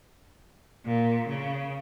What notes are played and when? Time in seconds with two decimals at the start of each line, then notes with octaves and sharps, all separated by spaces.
0.85 A#2
1.28 C#3